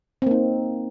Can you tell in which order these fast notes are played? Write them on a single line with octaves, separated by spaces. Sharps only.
C4 A#3 D#4